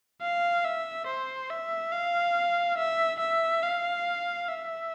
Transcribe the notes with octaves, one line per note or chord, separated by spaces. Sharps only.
F5
E5
C5
E5
F5
E5
E5
F5
E5